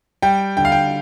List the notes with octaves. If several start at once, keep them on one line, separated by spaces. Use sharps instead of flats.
G3 G5
D3 G5
F5
G5